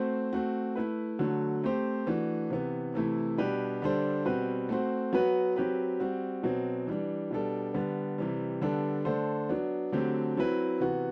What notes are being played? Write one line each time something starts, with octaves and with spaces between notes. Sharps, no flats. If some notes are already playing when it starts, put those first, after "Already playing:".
Already playing: A3 C4 F#4 C5
A3 C4 F#4
A3 E4 B4
D3 F#3 A3
A3 C4 G4 C5
E3 A3 D4 F#4
C3 E3 B3
C3 E3 A3 E4
B2 G3 D4 G4 B4
D3 G3 D4 A4 C5
B2 G3 C4 F#4 B4
A3 C4 F#4 C5
F#3 B3 F#4 B4
F#3 C4 G4 B4
G3 C4 F#4
B2 F#3 C4
E3 G3 D4
B2 G3 D4 A4
D3 G3 B3
C3 E3 G3
D3 G3 B3 D4 A4
D3 A3 D4 A4 C5
F#3 B3 D4
D3 F#3 A3 C4 G4
F#3 C4 E4 B4
C3 E3 B3 F#4